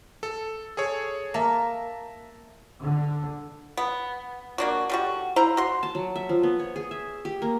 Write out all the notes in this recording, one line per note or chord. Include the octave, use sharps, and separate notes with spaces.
A4
G#4 A4 C#5
A#3 E5 A5 A#5
D3
B3
A#3 D4 F#4
D3 G3 F#4
E4 C5 F5 A#5
F#4 C6
A5
F#3
E5
F3
B3
C#5
G#4
E5
G4
A#3